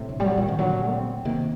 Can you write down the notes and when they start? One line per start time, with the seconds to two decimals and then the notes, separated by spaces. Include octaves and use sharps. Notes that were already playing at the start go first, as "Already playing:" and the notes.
Already playing: A2 C3
0.09 D3
0.20 G3
0.25 F#3
0.37 A#2 D#3 F#3
0.48 C3
0.59 A#2 D3 F#3
0.91 C4
1.25 C3 D#3 A#3